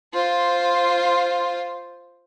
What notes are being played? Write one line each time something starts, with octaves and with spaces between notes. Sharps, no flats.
F4 C5